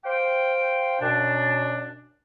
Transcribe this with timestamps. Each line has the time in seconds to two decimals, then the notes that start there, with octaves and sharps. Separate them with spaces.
0.05 C5 F5 G5
1.01 F#2 B2 D4